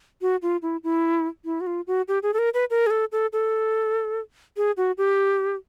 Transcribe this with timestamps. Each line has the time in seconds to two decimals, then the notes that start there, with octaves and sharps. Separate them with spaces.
0.22 F#4
0.42 F4
0.62 E4
0.84 E4
1.45 E4
1.61 F#4
1.67 F4
1.87 F#4
2.08 G4
2.23 G#4
2.34 A4
2.39 A#4
2.54 B4
2.70 A#4
2.87 G#4
2.90 A4
3.12 A4
3.33 A4
4.57 G#4
4.77 F#4
4.98 G4